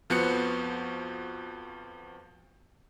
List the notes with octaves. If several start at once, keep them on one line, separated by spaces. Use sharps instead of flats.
F2 F3 B3 F#4 F#6 C#7